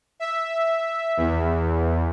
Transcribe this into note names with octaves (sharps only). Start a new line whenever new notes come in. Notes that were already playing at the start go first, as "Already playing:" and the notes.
E5
E2